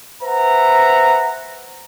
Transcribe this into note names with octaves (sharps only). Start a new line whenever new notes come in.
B4 C5 E5 F#5 A#5